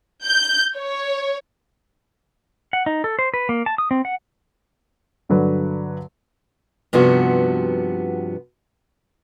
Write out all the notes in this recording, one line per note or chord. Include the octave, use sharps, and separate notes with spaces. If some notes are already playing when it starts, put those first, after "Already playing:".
G6
C#5
F#5
D#4
A4
C5
B4
A#3
A5
D#6
C4
F#5
G2 D3 F#3 B4
G2 C3 F3 B3 F#4